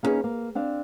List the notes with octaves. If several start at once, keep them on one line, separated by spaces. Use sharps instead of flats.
A#3 B3 C#4 D#4 G#4 B4
A#3
C4 D4 F5